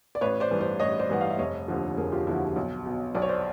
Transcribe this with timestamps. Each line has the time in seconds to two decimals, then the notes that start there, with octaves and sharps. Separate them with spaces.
0.15 D5
0.21 A1 B4 C#5
0.40 C5 D5
0.51 G2 E3
0.61 C5 D5
0.80 A1 C#5 D#5
0.99 C5 D5
1.10 G2 E3 F#5
1.21 F5
1.30 E5
1.39 F1 C#5 D#5
1.68 D#2 D3 F3
1.97 F1 G#4 A#4
2.12 F4 G4
2.26 D#2 D3 F3 E4 F#4
2.56 B1
2.86 B2
3.15 B1 D5
3.22 C#5
3.29 C5 D5